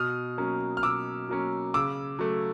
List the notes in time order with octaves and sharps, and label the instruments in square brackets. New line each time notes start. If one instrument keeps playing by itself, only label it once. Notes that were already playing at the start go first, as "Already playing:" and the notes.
Already playing: [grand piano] B2 D#6 F6
F#3 A#3 C#4
F6
B2 D6 E6
F#3 A#3 C#4
C#3 D6 E6
F#3 A3